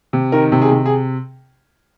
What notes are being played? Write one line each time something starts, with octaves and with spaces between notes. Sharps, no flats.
C3
D#3 A#4
C3
G#4
C3
G#4